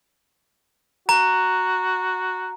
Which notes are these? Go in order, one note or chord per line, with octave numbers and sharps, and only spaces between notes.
F#4 A#5